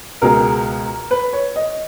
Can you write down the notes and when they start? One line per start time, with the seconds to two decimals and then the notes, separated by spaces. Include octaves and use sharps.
0.22 C#2 B2 G#3 A#4
1.11 B4
1.33 C#5
1.56 D#5